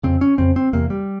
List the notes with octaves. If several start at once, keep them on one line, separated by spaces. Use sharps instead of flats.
F2 C#3 C4
C#4
F2 C#3 C4
C4
E2 C3 A#3
G3